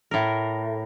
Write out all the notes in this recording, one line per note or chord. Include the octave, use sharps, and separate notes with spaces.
A2 A#4